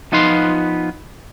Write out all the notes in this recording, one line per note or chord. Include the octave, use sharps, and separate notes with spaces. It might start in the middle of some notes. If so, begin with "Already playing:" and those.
F3 B3 D#4 F4 B4 C6